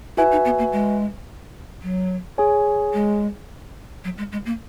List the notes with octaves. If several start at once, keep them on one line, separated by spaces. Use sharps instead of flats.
E4 F#4 B4 E5 G#5
D#4
B3
A#3
G#3
F#3
G#4 C#5 G#5
G#3
F#3
G#3
G#3
A#3